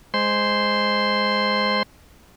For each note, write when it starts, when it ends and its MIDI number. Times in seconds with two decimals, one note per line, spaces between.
0.14 1.83 56
0.14 1.83 72
0.14 1.83 84